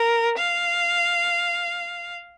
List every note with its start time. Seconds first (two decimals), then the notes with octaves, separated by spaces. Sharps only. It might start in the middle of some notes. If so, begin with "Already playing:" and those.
Already playing: A#4
0.38 F5